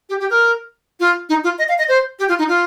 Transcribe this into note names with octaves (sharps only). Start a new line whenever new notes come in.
G4
G4
A#4
F4
D#4
F4
D#5
F5
D#5
C5
G4
F4
D#4
F4